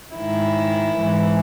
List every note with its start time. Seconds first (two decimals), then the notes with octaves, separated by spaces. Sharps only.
0.17 G#2 D#3 E4
0.95 G#2 E3